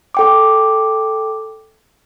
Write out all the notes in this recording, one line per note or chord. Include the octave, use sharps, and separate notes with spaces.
A4 G5 D6